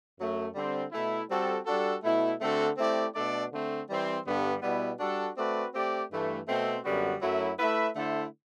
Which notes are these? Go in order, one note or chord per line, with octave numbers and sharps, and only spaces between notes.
F#2 F#3 A3
D3 G3 C4
B2 A3 E4
G3 C4 F#4 A4
G3 D4 F#4 A4
B2 A3 E4
D3 A3 C4 F#4 A4
A3 C4 E4 G4 D5
B2 A3 D4 A4 D5
D3 A3 C4
E3 G3 C4
G2 D3 G3 B3
B2 G3 B3 E4
G3 D4 F#4 A4
A3 C4 F#4 B4 D5
A3 C4 G4 D5
G2 E3 A3
B2 A3 C4
F#2 D3 G3 B3 F#4
F#2 F#3 A3 E4
A3 E4 B4 E5
D3 A3 E4 A4 C5